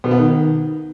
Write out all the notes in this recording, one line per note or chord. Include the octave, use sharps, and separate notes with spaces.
B2
B3
D#3